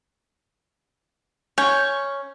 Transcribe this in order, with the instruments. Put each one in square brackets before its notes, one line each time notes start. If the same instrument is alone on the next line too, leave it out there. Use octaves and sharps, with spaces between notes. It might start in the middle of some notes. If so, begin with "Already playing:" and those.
[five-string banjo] C#4 [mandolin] C#6 G6